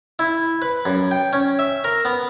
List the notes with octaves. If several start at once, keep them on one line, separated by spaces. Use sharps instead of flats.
E4
B4
F#2
G5
C#4
E5
A#4
B3